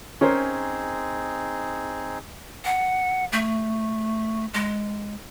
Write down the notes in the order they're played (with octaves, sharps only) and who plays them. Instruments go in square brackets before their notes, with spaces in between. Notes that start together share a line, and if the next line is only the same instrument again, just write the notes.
[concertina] C4 D#4 G#4 [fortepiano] C#4 A#4 C5
[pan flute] F#5
A3
G#3